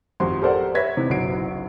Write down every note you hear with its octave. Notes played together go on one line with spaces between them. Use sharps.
G#1 F2 F#4 G4 C6
G4 A4 A#4 C5 D5 F#5
B4 C#5 E5 G#6 A#6 B6
C3 D#3 E3 D#4
F#1 B1 F#3 F#4 C7 D7